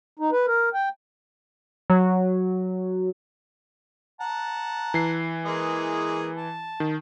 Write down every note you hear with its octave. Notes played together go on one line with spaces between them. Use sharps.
D#4
B4
A#4
G5
F#3
F#5 A5 A#5
E3 C7
G#3 A#3 G#4
A5
D#3